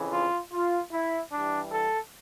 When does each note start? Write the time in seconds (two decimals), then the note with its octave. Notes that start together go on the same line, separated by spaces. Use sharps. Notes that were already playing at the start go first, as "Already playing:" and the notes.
Already playing: F2 C#3 E3
0.12 F4
0.52 F4
0.91 E4
1.31 G2 E3 G3 D4
1.71 A4